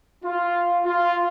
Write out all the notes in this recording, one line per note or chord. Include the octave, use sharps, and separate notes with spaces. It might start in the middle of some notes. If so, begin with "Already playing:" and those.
F4
F4